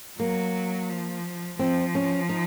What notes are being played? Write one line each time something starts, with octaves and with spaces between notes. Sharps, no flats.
F#3 A#3
F3
F3 C4
C#4
D#4